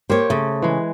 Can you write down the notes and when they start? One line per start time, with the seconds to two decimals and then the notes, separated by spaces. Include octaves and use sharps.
0.10 A#3 G4 C5 C#5
0.30 C#3 A3
0.62 E3 G#3